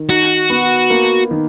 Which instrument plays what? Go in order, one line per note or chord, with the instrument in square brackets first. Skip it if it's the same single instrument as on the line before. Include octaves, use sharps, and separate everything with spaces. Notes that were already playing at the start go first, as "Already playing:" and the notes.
Already playing: [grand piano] D#3
[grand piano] D#4 [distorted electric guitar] F#4
[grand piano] B3
A#3
D#3